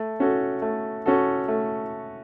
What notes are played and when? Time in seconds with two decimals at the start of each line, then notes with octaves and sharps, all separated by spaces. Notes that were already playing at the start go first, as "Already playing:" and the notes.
Already playing: A3
0.20 C#4 F#4 A4
0.62 A3
1.06 C#4 F#4 A4
1.48 A3